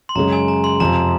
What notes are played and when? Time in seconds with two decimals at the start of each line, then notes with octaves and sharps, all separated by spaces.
0.09 C6
0.15 F#2 C#3 G#3 A#5
0.32 G#5
0.48 A#5
0.64 C6
0.80 F2 C3 F3 A#5